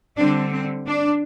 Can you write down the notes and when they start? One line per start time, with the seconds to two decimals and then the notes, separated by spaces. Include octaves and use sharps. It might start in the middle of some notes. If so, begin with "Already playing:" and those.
0.17 D3 G3 C4 D4
0.52 C4
0.87 D4